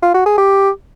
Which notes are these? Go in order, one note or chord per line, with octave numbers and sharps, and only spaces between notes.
F4
F#4
G#4
G4